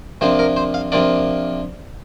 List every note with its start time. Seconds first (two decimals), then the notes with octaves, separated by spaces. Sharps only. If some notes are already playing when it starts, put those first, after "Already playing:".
0.21 C3 F3 A#3 D4 C5
0.39 A#4
0.56 C5
0.74 F5
0.92 C3 F3 A#3 D4 D5